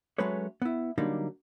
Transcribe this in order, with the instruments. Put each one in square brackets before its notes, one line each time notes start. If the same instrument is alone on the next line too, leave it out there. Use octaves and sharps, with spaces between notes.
[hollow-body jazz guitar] F#3 G#3 A3 C#4 B4 C#5
B3 E4
D3 F#3 G3 A#3 D4 D#4